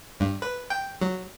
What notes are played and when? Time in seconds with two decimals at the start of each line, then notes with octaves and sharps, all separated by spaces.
0.20 G2
0.42 B4
0.70 G5
1.01 F#3